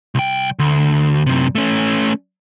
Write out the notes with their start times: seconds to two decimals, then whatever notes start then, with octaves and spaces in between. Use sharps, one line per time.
0.15 C2 G5
0.59 D2
1.26 F#2 C3
1.55 A3 C#4